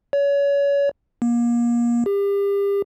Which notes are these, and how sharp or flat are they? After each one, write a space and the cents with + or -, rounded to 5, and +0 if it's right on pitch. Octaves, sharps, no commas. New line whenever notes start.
C#5 +30
A#3 +30
G4 +35